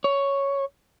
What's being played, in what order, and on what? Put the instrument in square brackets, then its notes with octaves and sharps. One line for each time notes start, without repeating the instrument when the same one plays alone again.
[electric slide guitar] C#5